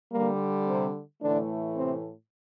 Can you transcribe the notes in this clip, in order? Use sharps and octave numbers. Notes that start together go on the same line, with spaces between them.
D3 G3 A#3
C3 C4
A2 D3 E3 A3 D4
C3 C4